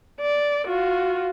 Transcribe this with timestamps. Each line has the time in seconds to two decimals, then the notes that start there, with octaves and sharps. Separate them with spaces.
0.21 D5
0.67 F4 F#4